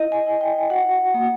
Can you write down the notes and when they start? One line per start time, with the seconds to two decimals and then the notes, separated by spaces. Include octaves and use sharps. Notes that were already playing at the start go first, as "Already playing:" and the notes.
Already playing: E4 D#5
0.12 G#5
0.26 E4
0.41 G5
0.70 F#4 F#5
1.14 A#3